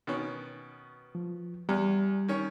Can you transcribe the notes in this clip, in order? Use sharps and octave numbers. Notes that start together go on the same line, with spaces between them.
B2 D#3 C#4
F3
E2 G3
D#3 C#4